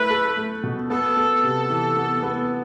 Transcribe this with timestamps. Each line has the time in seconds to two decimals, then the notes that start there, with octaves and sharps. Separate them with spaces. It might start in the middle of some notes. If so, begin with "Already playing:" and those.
Already playing: A3 E4 A4 B4
0.10 A4
0.36 A3
0.63 B2
0.90 B3 A4
1.17 B3
1.43 C3
1.70 E3
1.96 B3
2.23 B3